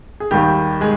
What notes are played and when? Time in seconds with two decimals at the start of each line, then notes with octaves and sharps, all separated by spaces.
0.20 G#4
0.31 D#2 D#3 G3 G4
0.81 G#3 G#4